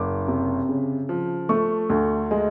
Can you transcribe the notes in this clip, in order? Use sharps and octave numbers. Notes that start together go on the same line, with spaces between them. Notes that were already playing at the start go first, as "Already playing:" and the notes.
Already playing: F#1 D6
C3
C#3
F3
A3 C#6
D2
G#3